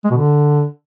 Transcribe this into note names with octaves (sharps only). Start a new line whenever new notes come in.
G#3
B2
D3